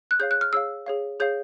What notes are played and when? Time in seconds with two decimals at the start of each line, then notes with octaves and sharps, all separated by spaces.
0.11 F#6
0.19 G#4 C#5 F5 G6
0.31 F#6
0.41 F6
0.53 G#4 C#5 F5 E6
0.86 G#4 C#5 F5
1.20 G#4 C#5 F5 G6